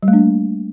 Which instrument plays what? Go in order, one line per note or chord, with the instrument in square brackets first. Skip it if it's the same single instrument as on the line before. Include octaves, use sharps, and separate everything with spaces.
[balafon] G3
A3
D4
A#3